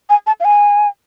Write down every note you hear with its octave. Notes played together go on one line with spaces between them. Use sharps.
G#5
A5
F5
G#5